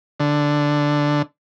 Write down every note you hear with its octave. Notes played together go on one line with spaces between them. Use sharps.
D3